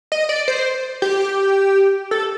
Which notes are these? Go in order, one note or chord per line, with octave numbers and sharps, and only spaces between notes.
D#5
D5
C5
G4
A4